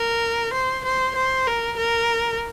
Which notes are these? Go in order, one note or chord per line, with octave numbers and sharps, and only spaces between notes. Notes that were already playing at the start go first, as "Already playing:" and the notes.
Already playing: A#4
C5
C5
C5
A#4
A#4